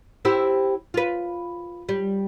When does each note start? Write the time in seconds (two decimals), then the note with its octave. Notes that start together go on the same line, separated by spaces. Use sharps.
0.25 C4 E4 G4
0.94 F4 B4
1.89 G3